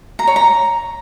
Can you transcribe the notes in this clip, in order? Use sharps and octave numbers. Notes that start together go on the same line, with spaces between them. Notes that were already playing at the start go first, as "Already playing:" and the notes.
A#5
C#5
A#5